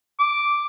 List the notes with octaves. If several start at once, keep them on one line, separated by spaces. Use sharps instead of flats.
D6